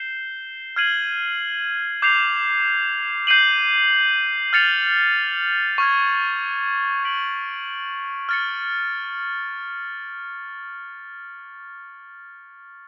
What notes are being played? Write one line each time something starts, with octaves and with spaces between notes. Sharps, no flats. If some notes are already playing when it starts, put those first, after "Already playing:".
Already playing: G6 C7 E7 G7
F6 G#6 C7 D#7 F#7
D6 G6 C7 F7
G6 C7 D#7 F#7
F6 A6 C#7 F7
C#6 F6 G#6
G#6 B6 D7 F#7
F6 A6 C#7